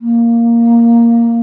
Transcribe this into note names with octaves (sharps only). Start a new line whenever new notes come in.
A#3